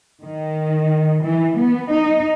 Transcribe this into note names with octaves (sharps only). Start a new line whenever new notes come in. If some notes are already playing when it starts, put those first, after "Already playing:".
D#3
E3
B3
D#4